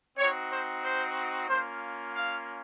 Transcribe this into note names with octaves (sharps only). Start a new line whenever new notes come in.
C4 D#4 F#4 C#5
C5
C5
A#3 C#4 F4 C5
F5